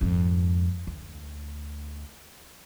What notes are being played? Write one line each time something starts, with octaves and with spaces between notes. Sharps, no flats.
F2 G#2
D2